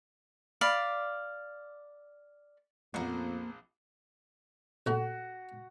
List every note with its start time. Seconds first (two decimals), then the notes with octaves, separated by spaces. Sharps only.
0.61 D5 F5 B5
2.94 A#1 F2 A#3 B3 C5 F#5
4.86 A#1 A3 F#4